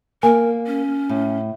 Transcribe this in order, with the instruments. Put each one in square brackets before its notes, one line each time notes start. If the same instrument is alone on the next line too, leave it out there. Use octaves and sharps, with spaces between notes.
[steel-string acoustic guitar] A#3 [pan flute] A#4 [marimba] G#5
[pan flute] C#4
[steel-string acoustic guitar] A2